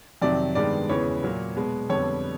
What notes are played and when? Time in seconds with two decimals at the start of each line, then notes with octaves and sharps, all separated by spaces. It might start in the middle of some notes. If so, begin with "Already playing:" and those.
0.22 F2 C3 D#3 F#3 D5
0.55 G2 D#3 G#3 B3 D5
0.89 E2 C#3 E3 G#3 B3 C#5
1.23 A#2 F#3 A#3
1.56 B2 G#3 B3
1.89 F2 D3 G3 B3 C#5